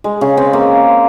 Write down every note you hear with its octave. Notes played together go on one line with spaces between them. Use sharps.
G#3
C#3
C4
A#3